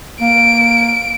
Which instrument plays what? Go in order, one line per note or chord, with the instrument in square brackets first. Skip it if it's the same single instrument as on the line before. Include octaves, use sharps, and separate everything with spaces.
[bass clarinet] A#3 [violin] D7